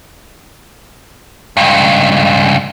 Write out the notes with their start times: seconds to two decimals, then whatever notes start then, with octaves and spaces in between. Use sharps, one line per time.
1.57 C#2 G2